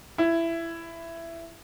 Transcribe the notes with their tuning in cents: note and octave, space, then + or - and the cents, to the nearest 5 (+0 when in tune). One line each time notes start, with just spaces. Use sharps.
E4 +15